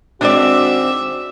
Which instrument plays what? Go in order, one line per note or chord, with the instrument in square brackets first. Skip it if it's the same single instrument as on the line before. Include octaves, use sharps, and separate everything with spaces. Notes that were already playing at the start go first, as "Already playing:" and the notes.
[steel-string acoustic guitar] D#3 G#3 C4 [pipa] D4 D5 [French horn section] F#4 [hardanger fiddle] E5